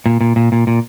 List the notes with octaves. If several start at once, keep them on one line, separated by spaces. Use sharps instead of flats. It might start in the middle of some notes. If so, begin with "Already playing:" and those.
A#2
A#2
A#2
A#2
A#2